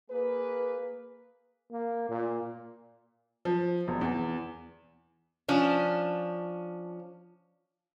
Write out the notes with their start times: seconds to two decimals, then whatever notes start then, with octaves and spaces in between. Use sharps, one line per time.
0.11 A#3 G#4 B4
1.71 A#3
2.09 A#2
3.45 F3
3.88 E1
4.01 E2
5.48 F3 C#4 D4